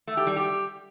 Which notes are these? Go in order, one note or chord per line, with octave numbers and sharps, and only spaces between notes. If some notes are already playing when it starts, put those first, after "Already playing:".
A3
G4
G3
G4